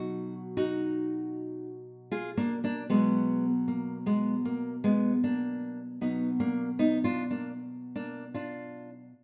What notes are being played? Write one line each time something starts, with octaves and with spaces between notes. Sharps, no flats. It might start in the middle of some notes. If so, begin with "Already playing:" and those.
Already playing: B2 F#3 D#4 F#4
D#4 F#4
F4 G#4
A#3 D4
A#3 D4
B2 F#3 G#3 B3
A#3
G#3 B3
A#3
G#3 B3
A#3 D4
B2 F#3 B3 D#4
A#3 D4
B3 D#4
D4 F4
A#3 D4
A#3 D4
D4 F4